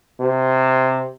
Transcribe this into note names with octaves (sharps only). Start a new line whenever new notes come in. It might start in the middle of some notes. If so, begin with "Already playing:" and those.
C3